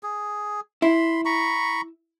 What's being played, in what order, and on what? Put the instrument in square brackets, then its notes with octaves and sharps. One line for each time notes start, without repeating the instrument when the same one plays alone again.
[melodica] G#4
[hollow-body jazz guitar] E4 [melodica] B5 C6
[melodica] A#5 B5 C#6